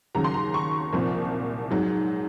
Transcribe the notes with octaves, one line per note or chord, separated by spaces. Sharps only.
D#2 C#3 F#3 A#5
C6
A#5
C#6
C2 A#2 F3
G#2 F#3